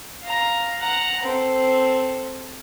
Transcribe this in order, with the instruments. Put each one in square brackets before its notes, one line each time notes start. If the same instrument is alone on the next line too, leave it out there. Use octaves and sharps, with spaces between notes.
[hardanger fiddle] F5 A#5
F#5 A#5
C4 A4